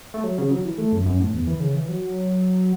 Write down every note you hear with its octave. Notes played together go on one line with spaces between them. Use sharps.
A3
F#3
C#3
F#3
E3
A3
F#2
F#2
A2
E2
E3
C#3
E3
F#3